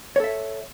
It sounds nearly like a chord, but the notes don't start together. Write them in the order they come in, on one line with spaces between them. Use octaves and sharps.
C#5 A4 E5